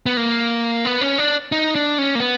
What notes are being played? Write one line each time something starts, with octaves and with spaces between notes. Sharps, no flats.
B3
A#3
B3
C#4
D4
D#4
D4
C#4
A#3
B3